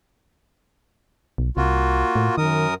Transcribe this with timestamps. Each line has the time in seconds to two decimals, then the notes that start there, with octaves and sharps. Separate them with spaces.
1.38 B1
1.57 C2 A#3 F4 F#4
2.16 A2
2.38 F#2 D#3 A#4 D#6